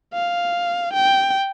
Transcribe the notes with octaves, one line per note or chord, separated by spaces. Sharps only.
F5
G5